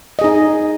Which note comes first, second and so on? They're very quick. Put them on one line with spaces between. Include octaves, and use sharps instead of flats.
D#5 G#4 D#4